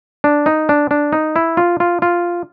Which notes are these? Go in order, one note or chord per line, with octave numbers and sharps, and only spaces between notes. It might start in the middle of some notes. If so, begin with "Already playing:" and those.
D4
D#4
D4
D4
D#4
E4
F4
F4
F4